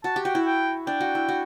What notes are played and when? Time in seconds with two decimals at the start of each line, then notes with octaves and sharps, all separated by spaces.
0.04 F#4 A5
0.16 G4
0.25 F#4 G5
0.35 E4
0.46 G5
0.87 D4 G5
1.00 F#4
1.15 E4
1.29 F#4